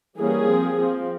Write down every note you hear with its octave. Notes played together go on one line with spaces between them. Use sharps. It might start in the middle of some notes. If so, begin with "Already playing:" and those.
E3 G3 A#3 C#4 G#4
F3 C4
F3 C4